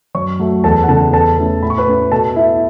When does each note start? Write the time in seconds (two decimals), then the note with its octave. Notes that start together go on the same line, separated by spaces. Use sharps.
0.15 F#2 C#5 C#6
0.40 F#3 A3
0.64 E2 A4 A5
0.83 F#5
0.88 C#3 E3 B3 A4 A5
1.13 E2 A4 A5
1.38 E3 A3 C#4
1.62 A2 B5
1.70 C#6
1.78 B4 B5
1.87 A3 C#4
2.12 B2 A4 A5
2.36 B3 E4 E5